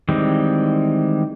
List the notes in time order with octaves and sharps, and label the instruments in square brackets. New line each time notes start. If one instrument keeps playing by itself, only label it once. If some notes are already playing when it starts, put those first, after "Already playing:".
[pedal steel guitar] D#3 E3 G3 G#3 C4